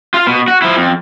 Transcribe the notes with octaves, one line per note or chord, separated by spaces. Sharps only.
F4 F5
B2
F#4
F3 E4
F2